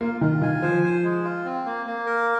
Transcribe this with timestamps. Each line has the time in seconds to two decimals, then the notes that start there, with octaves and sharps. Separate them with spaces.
0.01 A#3 F4
0.21 D#3 F4
0.42 D#3 G#5
0.62 F3 C5
0.83 C5
1.04 G#3
1.24 F4
1.45 C4
1.66 A#3
1.86 A#3
2.06 A#4